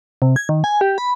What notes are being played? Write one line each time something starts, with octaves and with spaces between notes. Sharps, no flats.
C3
G#6
D#3
G#5
G4
B5